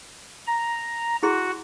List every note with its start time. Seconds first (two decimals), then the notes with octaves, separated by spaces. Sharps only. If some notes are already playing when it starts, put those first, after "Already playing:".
0.47 A#5
1.23 E4 F#4 G#4 C6